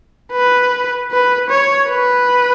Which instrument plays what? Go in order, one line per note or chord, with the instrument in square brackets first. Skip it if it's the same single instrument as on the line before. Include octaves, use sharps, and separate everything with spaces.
[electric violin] B4
B4
C#5
B4